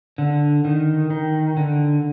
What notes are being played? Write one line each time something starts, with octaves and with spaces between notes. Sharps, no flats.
D3
D#3
D#3
D3